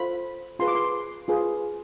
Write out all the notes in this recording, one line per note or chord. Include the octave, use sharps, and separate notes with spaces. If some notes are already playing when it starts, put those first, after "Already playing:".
Already playing: F4 A4 C5 B5
F4 G#4 B4 C6
D6
C6
F4 G#4 B4